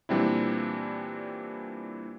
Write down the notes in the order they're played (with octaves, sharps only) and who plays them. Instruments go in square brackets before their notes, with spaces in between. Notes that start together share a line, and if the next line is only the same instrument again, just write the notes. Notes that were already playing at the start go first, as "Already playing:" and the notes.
[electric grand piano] A#2 E3 G3 C4 D4 E4